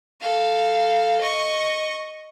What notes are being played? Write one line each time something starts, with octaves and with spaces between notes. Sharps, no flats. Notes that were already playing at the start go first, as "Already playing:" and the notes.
A4 F5
D#5 C#6